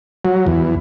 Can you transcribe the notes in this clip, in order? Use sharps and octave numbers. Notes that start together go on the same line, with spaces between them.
F#3
E2